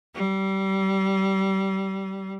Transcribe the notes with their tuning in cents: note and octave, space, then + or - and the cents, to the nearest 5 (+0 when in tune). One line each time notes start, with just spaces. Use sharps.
G3 -25